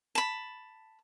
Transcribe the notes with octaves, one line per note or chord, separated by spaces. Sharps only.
A5 B5